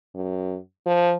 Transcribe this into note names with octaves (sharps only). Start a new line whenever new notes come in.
F#2
F3